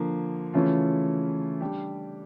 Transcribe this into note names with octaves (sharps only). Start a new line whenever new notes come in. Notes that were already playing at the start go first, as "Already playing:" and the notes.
Already playing: D3 F3 A#3
C#3 E3 A3 C#4 F4
G3 D4 G4